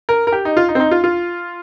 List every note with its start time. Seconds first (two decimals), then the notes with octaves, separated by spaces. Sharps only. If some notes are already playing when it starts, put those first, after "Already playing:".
0.09 A#4
0.27 A#4
0.32 G4
0.45 D#4
0.57 F4
0.69 D#4
0.75 C4
0.80 D#4
0.91 F4
1.04 F4